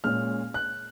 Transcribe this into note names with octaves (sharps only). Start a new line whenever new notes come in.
A#2 G#3 C#4 F6
F#6